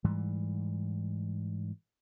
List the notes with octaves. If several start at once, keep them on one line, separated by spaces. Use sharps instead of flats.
G#2 E3 G3